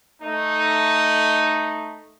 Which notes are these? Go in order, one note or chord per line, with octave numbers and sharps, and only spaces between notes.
A3 D#4